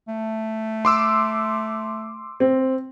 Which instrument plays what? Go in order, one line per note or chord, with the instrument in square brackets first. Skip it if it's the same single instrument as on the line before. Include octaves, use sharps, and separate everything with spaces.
[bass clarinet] A3
[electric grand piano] C6 D6 E6
[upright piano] C4